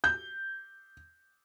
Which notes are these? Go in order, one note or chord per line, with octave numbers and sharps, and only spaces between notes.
G6